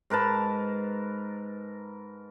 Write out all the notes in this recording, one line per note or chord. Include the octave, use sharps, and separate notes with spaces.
G#2 A#4 B4 A5